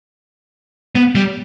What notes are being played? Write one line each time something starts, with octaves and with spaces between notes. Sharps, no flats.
B3
G3